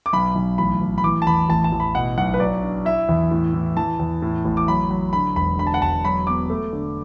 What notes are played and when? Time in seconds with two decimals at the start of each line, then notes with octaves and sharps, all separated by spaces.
0.06 D6
0.13 B1 B5
0.35 B1
0.58 A1 B5
0.81 A1
0.98 B5
1.04 E3 D6
1.22 A5
1.27 E2 B5
1.49 A1 A5
1.64 A5
1.72 A1
1.80 B5
1.95 B2 F#5
2.18 B1 F#5
2.34 B4
2.40 F#3 D5
2.63 D4
2.85 E4 E5
3.09 E2
3.31 A2
3.54 E3
3.77 E3 A5
4.00 E2
4.22 A2
4.45 A1
4.57 D6
4.68 F#3 B5
4.91 F#3
5.13 D3 B5
5.36 E1 B5
5.58 D3 B5
5.67 A5
5.74 F#5
5.81 E1 A5
6.05 F#3 B5
6.27 B3 D6
6.50 A3
6.73 D3